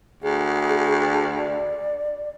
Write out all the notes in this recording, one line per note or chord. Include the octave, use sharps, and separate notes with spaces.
D2 G#4
D5